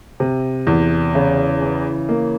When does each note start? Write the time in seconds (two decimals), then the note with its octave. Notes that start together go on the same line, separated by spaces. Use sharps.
0.20 C3
0.67 E2
1.15 C#3
1.62 E3
2.09 A#3